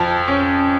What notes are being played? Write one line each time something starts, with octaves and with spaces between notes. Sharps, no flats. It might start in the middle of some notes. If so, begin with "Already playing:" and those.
Already playing: F2 F3
C#4